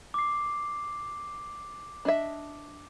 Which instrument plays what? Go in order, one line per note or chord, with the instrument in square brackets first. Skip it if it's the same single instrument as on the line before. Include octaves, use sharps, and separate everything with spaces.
[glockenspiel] D6 C7
[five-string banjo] D4 D#5 E5